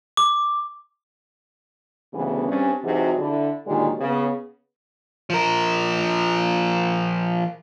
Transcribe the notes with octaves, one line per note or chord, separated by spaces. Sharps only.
D6
D2 G2 C#3 E3 B3
G2 G3 C4 C#4
C3 E3 F#3 D#4 F#4 G#4
D3 E4
A#2 D3 D#3 F#3 G#3 G4
C#3 B3
F3 A#4